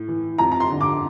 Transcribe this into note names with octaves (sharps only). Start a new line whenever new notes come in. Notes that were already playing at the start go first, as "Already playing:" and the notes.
Already playing: A2
E3
F2 A#5
A#5
C6
D3
D6